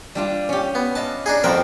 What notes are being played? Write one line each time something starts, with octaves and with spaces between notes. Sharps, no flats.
G3 D4 F4
C#4 G4
B3
B4 D#5 F5 A5
D4 D#4 G#4
F2 F3 C4 F#4 A#4 B4